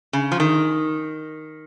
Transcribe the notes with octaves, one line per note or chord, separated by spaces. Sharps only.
C#3
F3
D#3